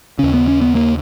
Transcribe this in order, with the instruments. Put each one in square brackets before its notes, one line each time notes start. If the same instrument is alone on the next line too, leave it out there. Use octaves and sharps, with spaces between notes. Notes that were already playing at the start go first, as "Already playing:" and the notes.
[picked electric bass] D#2 C#3 C#4
B3
C#4
B3
A#3